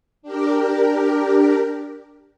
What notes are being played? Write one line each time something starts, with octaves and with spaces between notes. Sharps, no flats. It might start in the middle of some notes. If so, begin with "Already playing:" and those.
D4 G4 A#4